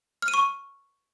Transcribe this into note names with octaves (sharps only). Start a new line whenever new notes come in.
F6
D#7
C#6